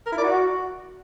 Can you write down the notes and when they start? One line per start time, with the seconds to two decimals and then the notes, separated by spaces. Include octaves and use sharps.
0.06 A#4
0.12 E4
0.18 D5
0.23 F#4